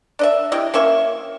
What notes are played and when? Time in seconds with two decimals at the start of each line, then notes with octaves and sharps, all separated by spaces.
0.19 D4 D#5 E5
0.52 C3 E4 D#5
0.74 A#3 C#4 E5 C#6